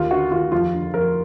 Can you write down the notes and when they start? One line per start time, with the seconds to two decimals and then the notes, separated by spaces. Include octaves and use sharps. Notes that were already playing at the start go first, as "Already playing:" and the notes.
Already playing: D#2 F4
0.10 D3 F#4
0.32 D#2 F4
0.52 F2 F4
0.73 D3
0.94 F2 A#4